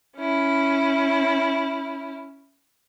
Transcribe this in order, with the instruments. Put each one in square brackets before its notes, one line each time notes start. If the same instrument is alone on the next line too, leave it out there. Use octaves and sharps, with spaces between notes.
[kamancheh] C#4 E4